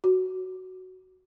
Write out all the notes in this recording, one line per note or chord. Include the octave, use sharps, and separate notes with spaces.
F#4